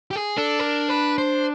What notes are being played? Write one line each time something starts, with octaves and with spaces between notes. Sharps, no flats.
G4
G#4
D4 A4
A#4
B4
C5